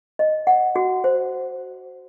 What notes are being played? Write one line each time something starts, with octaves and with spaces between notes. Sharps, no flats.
D#5
F#5
F#4
C5